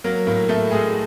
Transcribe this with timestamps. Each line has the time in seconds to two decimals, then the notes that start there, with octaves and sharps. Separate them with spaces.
0.04 F#3 A#3 A#4
0.27 A2 A#3 A#4
0.49 A2 A3 A4
0.71 A2 G#3 G#4